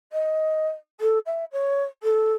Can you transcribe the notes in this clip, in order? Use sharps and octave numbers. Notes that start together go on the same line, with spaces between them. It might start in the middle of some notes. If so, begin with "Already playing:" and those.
D#5
A4
E5
C#5
A4